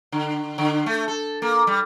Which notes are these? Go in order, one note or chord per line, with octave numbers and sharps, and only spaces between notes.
D3
D3
A3
A4
A#3
G3